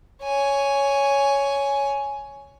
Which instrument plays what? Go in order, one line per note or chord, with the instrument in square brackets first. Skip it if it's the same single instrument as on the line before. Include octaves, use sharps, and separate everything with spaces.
[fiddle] C#5 G#5